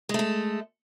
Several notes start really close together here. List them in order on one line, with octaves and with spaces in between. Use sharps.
G#3 A3 A4